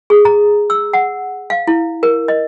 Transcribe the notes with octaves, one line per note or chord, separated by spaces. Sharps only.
G#4
A#5
E6
F#5
F5
E4
A#4
D#5